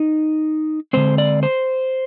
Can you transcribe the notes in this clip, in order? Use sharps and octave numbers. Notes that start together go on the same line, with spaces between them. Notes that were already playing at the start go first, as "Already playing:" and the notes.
Already playing: D#4
D3 G#3 C4 C5
D5
C5